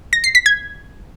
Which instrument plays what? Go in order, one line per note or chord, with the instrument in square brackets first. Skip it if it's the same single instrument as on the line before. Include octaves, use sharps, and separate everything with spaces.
[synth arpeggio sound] A#6
C7
B6
G#6